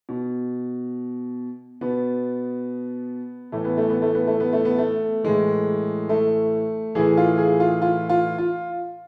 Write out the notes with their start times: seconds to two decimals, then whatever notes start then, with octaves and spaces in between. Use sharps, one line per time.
0.09 B2
1.81 B2 B3
3.52 A2 E3 A3
3.65 B3
3.77 A3
3.90 B3
4.02 A3
4.15 B3
4.27 A3
4.40 B3
4.53 A3
4.65 B3
4.78 A3
5.24 A2 E3 G#3
6.09 A3
6.95 A2 E3 G#4
7.17 F4
7.38 G#4
7.60 F4
7.82 F4
8.09 F4
8.38 F4